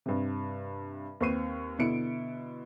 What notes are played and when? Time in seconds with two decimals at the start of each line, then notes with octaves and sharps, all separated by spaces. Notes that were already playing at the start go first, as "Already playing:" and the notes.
0.06 G2 C3
1.20 D#2 C4 B4 C#6 C7 D#7
1.79 B2 D3 E4 C#7 D7